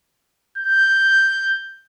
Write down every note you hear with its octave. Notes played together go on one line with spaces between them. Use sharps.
G6